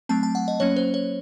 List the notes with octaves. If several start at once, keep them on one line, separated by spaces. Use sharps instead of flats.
F#3 A3 C4 A5
A5
F#5
D#5
F#3 A#3 C#4 C#5
C5
C#5